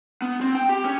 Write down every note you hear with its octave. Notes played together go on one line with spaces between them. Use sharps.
B3
C4
G5
G4
C#4